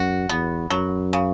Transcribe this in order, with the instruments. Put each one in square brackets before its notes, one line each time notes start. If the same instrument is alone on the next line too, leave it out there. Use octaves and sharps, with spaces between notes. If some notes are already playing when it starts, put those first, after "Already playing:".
Already playing: [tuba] F#2 [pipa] F#4
[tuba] E2 [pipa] B3
[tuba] F#2 [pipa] F#3
[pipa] C#3